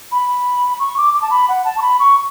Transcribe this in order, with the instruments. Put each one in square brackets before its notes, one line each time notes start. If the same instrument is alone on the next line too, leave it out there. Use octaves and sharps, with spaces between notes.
[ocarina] B5
C#6
D6
D6
A5
B5
F#5
A5
C#6
B5
C#6